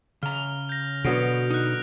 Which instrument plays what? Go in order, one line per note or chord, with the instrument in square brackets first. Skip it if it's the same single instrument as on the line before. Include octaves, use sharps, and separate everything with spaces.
[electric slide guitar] C#3 A#5 [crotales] F6 F7
[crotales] G6 A#6
[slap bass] B2 [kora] D3 F#3 B3 [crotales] D#6 A#6 D7
[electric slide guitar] D#4 [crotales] D#6 F#6